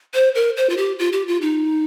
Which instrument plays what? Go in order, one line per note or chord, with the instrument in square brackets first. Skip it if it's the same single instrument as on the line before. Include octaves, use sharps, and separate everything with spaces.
[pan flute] C5
A#4
C5
F4
G4
F4
G4
F4
D#4